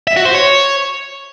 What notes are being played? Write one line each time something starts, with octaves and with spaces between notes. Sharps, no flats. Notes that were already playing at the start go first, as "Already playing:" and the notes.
E5
F#4
C5
C#5